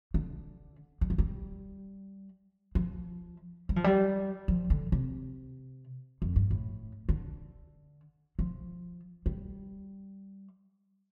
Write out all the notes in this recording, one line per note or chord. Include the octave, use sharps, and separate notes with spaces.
D3
G3
F3
G3
F3
G3
F3
G3
F3
D3
C3
F2
G2
A2
D3
F3
G3